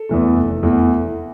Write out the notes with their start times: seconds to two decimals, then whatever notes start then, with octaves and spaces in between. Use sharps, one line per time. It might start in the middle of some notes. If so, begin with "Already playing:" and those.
Already playing: A4
0.09 E2 E3 A3
0.36 F1
0.63 E2 E3 A3